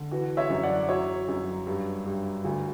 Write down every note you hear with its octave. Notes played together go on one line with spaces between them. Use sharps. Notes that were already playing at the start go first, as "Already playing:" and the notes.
Already playing: D3
E3 F#4
C#5 E5
F#2
D5 F#5
F#3 C#5 E5
F#2
G2
G2
D2